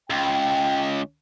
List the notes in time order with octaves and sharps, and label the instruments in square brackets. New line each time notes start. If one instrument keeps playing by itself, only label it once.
[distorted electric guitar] C#2 [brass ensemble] G5